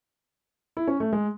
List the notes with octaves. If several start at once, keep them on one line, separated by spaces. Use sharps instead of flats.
E4
C#4
A3
G#3